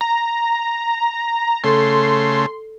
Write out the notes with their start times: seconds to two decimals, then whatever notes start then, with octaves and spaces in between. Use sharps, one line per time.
0.01 A#5
1.64 C#3 A3 A4 C6